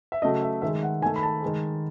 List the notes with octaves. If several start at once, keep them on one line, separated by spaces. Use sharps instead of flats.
E5
C#3 F#3 A3 D#5
E5
D#3 G#3 E5
F#5
D#3 A3 G#5
B5
A5
D#3 G#3